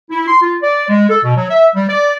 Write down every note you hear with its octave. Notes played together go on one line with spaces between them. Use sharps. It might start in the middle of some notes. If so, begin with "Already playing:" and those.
E4
C6
F4
D5
G#3
A4
B2
F#3
E5
G3
D5